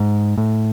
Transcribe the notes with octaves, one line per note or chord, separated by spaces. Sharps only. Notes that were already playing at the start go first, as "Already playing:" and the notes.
Already playing: G#2
A2